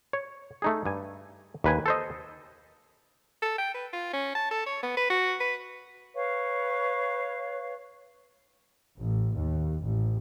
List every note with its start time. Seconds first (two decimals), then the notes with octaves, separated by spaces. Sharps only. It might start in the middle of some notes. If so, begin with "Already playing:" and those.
0.13 C#5
0.62 A3 D#4 G#4
0.85 G2 G#5
1.64 D#2 B4 G#5
1.86 A4 C5 D#5
3.42 A4
3.59 G5
3.74 B4
3.93 F4
4.13 C#4
4.35 A5
4.51 A4
4.66 C#5
4.83 B3
4.97 B4
5.10 F#4
5.41 B4
6.15 B4 C#5 F5 C#6
8.99 A1
9.35 D#2
9.82 A1